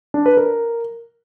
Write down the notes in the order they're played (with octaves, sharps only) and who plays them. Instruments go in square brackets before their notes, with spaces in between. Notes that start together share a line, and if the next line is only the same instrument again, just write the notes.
[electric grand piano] D4
B4
A#4